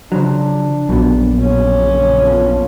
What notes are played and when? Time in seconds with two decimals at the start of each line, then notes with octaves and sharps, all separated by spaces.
0.12 C#3 F3 F#3 D4
0.89 A#1 F#2 B2
1.38 C#4
1.78 C#3
2.22 B3 F4 A4